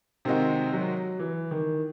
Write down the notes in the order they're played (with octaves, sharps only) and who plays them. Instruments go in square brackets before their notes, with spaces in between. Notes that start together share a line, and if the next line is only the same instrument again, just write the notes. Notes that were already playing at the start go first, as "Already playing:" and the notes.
[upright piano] C3 D#3 G#3 D#4 F#4 [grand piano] C4
[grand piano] F#3
E3
D#3